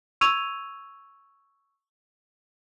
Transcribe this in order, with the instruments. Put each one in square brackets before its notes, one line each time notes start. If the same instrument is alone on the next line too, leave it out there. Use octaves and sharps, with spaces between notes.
[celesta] C#6 E6 G#6 D#7 F7